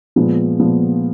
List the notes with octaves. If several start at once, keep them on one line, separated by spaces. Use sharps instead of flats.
A#2 F3 G#3 B3
A#2 F3 G#3 B3